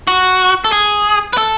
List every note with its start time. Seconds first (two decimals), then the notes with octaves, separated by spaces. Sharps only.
0.07 F#4
0.65 A4
0.72 G#4
1.33 B4
1.38 A4